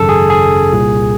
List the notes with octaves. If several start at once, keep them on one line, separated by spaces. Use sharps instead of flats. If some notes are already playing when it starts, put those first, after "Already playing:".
Already playing: G#1 F#2 C#3 A4
G#4
G#4
C2 A#2